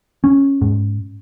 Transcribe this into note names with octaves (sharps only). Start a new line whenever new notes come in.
C#4
G#2